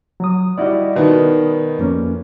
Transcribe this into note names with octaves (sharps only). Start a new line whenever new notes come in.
F#3 D#6
G3 E4 F#4 D5 D#5
B2 D#3 B3
F2 A#3 C#4